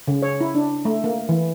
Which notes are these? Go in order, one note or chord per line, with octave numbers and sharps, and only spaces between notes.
C#3
C#5
E4
D4
A3
A#3
E3